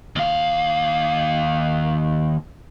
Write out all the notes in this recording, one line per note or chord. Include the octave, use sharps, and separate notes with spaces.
D#2 F5